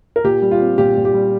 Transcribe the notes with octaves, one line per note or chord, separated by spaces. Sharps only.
A#4
A#2 G4
G3
F4
C4
A#2 G4
A#2
G4
G3